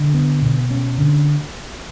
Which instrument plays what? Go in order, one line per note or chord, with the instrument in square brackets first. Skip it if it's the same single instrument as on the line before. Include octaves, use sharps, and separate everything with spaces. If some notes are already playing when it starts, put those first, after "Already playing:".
Already playing: [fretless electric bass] D3
B3
B2
C#4
D3